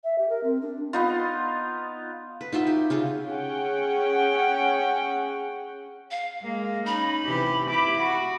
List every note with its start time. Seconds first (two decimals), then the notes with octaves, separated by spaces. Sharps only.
0.04 E5
0.18 G4
0.29 A#4
0.43 C4
0.61 D4
0.93 B3 D#4 F4
2.41 B4
2.52 D#4 F4 F#4 E5
2.67 G4
2.90 C#3 F4 G#4
3.26 C#4 G#4 F#5 G5
6.11 F5
6.43 G#3 A#3
6.86 C#4 D#4 B5
7.25 C3 E3 G4
7.68 E4 G4 D6
7.98 F#4